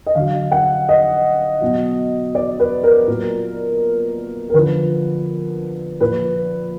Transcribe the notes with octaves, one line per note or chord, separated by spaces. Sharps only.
D#5
D3 F#3 F5
F#5
D#5
B2 F#3
D5
B4
A#4
A#2 F#3
A#4
D3 F3 B4
A#2 F3 B4